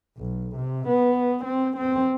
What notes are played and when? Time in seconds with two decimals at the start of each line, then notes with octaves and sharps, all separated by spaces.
0.17 B1
0.56 C3
0.88 B3
1.44 C4
1.77 C4